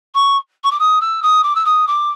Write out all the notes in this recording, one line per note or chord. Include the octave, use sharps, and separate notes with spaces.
C#6
C#6
D6
D#6
E6
D#6
D6
E6
D#6
D6